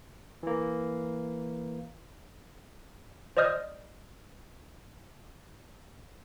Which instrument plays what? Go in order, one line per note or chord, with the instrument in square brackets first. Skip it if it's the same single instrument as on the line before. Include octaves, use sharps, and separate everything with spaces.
[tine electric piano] E3 A#3
[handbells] C5 D5 D#5 D#6 F6 G6